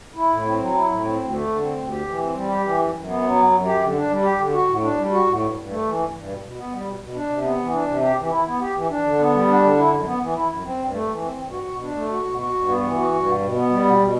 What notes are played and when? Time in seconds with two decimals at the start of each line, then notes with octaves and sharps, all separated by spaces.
0.15 E4
0.30 A2
0.46 C4
0.60 F#3
0.74 E4
0.89 A2
1.04 C4
1.18 D2
1.32 A3
1.47 D3
1.61 C4
1.77 D2
1.90 G4
2.05 E3
2.20 C4
2.35 G3
2.49 G4
2.63 E3
2.78 F#2
2.93 F#2
3.07 B3
3.22 F#3
3.36 F#2
3.51 F#2
3.66 G4
3.80 D3
3.95 D4
4.09 G3
4.23 G4
4.38 D3
4.53 F#4
4.67 A2
4.82 D4
4.97 G3
5.12 F#4
5.26 A2
5.40 G2
5.54 G2
5.69 A3
5.84 E3
5.99 G2
6.13 G2
6.28 B2
6.42 B2
6.56 B3
6.72 G3
6.85 B2
7.00 B2
7.15 D4
7.29 C3
7.43 B3
7.59 E3
7.73 D4
7.87 C3
8.02 G4
8.17 E3
8.31 E4
8.46 B3
8.61 G4
8.74 E3
8.89 D4
9.03 D3
9.19 B3
9.34 G3
9.47 D4
9.62 D3
9.77 E4
9.92 F#2
10.06 B3
10.21 E3
10.34 E4
10.49 F#2
10.64 C4
10.78 G2
10.93 A3
11.08 E3
11.22 C4
11.38 G2
11.51 F#4
11.65 B2
11.81 D4
11.95 A3
12.10 F#4
12.24 B2
12.39 F#4
12.54 G2
12.68 B3
12.83 E3
12.97 F#4
13.12 G2
13.26 B2
13.40 B2
13.56 B3
13.70 G3
13.85 B2
14.00 B2